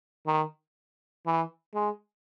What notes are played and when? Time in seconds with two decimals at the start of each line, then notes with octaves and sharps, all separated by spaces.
0.27 D#3
1.26 E3
1.74 G#3